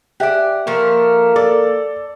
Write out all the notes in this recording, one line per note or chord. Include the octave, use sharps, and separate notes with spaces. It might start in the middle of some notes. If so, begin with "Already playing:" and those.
G4 D5 E5 F#5 G#5
F3 A3 A#3 A#4
A4 D5